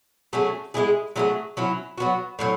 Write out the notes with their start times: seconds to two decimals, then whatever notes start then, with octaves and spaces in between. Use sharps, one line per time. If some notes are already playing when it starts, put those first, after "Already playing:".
0.33 F#3 A3 C#4 G#4
0.74 G#3 B3 E4 G#4
1.16 F#3 A3 E4 G#4
1.57 F#3 C#4 E4
1.98 F#3 B3 F#4
2.39 A2 F#3 C#4